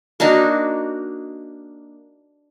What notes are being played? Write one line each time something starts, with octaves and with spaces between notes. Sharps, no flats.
A#3 D4 D#4 F#4